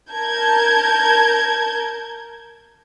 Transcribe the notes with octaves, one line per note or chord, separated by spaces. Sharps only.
A#4 A5 G6 G#6